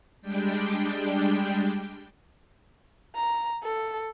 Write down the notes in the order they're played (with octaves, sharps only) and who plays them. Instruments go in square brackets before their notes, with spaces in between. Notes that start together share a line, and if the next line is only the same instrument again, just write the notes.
[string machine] G3 G#3 D4 G5
[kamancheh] A#5
A4